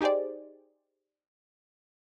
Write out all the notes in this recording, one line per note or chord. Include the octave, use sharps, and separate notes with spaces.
D#4 G4 G#4 C5 D5